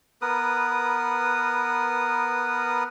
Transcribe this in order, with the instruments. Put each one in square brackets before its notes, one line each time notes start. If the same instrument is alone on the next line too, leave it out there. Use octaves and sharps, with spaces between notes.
[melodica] B3 A#4 B4 D#6